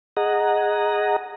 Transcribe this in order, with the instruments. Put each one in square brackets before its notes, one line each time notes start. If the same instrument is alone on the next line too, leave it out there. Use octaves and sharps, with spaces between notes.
[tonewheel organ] G#4 D#5 F#5 A#5